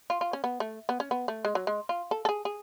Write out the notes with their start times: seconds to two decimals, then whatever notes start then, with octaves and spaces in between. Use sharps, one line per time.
0.10 F4
0.21 F4
0.33 C#4
0.44 B3
0.60 A3
0.89 B3
1.00 C#4
1.11 B3
1.28 A3
1.45 G#3
1.55 F#3
1.67 G#3
1.89 F4
2.11 A4
2.25 A4
2.29 G#4
2.45 G#4